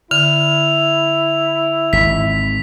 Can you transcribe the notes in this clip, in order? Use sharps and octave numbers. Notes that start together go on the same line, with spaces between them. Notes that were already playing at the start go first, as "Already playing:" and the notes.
D3 E4 F7
G#1 B6